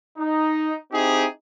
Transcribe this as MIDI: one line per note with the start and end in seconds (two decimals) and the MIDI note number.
0.18 0.73 63
0.92 1.26 60
0.92 1.26 63
0.92 1.26 64
0.92 1.26 67
0.92 1.26 68